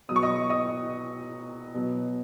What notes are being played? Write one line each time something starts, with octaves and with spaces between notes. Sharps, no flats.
B2 F#3 D#6
C#6
D#5 D#6
D#5 D#6
B2 F#3